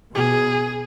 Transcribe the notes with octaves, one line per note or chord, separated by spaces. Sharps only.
B2 G#4